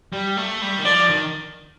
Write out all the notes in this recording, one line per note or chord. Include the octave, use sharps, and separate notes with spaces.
G3
A3
G3
D#3
F3 D5
D#3